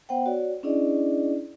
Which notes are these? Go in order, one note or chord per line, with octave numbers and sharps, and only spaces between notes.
B3 C5 F#5 G5
F#4 C#5 D5
C#4 D4 E4 G#4 D5 D#5